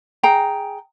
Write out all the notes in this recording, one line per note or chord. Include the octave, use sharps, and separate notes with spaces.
G#4 G5 A#5